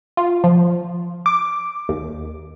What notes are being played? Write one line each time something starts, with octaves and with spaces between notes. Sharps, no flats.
F4
F3
D6
D#2